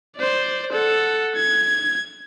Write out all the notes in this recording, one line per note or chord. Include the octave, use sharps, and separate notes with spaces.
C5 D5
A4 F#5
G#6